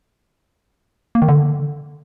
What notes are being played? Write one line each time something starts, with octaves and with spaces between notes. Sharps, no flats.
A#3
D#3
D3